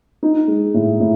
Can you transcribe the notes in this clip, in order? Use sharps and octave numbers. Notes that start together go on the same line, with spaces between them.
D#4
G#3
A2
A2